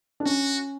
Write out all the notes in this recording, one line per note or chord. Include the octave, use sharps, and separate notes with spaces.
D4
C#4 F#4